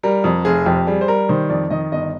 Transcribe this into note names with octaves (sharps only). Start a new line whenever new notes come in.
G3 A#4
F2
F1 G#4
F2 G4
G3 G#4
C5
G3 A#4
D#3 C5
F2 D5
D#3 D#5
G1 D#5